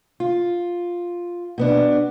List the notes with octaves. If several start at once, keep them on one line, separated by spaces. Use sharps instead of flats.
F4
B2 B3 D4